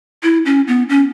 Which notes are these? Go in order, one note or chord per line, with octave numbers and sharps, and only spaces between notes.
E4
C#4
B3
C#4